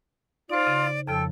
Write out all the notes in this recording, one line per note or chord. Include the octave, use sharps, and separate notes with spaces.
D#4 F4 C5 D5
C#3
F2 C#3 F3 A4 G5